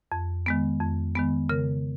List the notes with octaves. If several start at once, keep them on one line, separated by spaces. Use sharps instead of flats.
F2
D#3 G#3 B3
F2
D#3 G#3 B3
C#3 A#4